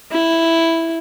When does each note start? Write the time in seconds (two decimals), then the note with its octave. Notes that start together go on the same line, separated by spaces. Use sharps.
0.11 E4